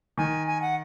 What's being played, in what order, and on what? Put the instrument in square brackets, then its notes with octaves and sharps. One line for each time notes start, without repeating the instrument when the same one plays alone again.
[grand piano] D#3 [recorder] G#5
[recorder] G#5
F#5